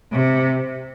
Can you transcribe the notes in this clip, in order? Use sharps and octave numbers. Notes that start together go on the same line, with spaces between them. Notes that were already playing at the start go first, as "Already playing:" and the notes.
C3